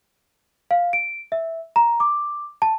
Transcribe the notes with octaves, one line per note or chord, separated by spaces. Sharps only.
F5
D7
E5
A#5
D6
A5